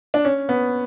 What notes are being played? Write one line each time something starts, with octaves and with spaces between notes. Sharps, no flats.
D4
C#4
B3